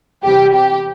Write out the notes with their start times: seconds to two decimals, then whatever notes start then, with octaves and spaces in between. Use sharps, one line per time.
0.23 E2 C3 G3 G4
0.54 G4